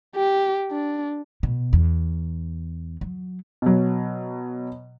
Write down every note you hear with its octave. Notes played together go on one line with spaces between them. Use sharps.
G4
D4
B2
E2
F#3
B2 F#3